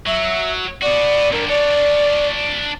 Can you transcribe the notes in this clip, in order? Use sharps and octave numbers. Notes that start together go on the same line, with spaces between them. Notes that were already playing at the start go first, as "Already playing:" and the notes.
F#3 E5
B3 F#4 D5
G2 D3 A#4
D4 C#5 D5